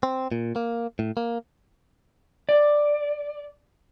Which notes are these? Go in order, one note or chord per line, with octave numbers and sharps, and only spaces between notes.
C4
A#2
A#3
A2
A#3
D5